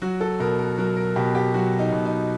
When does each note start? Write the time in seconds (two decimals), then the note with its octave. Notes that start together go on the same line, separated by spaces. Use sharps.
0.02 F#3 F#4
0.21 A4
0.40 B2 A#4
0.59 A#4
0.78 F#3 A#4
0.97 A#4
1.16 B2 G4
1.35 G4
1.54 F#3 F#4
1.79 D#4
1.92 B2
2.05 D#4